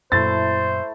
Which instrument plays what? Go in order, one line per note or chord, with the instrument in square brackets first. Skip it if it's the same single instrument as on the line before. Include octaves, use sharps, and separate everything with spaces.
[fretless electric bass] F#2 A#2 [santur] A3 E4 E5 [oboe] C5 [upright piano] A6